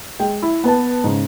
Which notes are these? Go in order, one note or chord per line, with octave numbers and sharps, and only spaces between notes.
G#3 G5
E4
B3 B4 A5
G#2 C#3